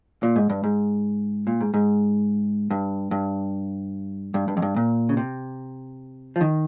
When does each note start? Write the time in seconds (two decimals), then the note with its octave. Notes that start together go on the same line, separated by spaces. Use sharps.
0.23 A#2
0.36 G#2
0.50 G2
0.64 G#2
1.47 A#2
1.61 G#2
1.74 G#2
2.71 G2
3.11 G2
4.34 G2
4.48 G2
4.57 F2
4.62 G2
4.76 A#2
5.09 C#3
5.17 C3
6.36 F3
6.41 D#3